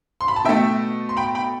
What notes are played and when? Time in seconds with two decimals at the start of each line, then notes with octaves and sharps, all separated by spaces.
0.21 C6
0.28 B5
0.36 A5
0.44 B2 A3 E5 G5
1.09 C6
1.17 G5 B5
1.35 G5 B5